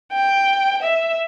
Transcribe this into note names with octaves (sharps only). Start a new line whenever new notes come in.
G5
E5